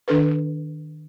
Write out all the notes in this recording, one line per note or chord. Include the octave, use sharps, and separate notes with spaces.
D#3 D4 A4 B4